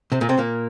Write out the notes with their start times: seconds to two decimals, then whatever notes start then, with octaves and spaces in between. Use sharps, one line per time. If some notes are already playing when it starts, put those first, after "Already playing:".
0.12 C3 C4
0.21 A#2 A#3
0.29 C3 C4
0.38 A#2 A#3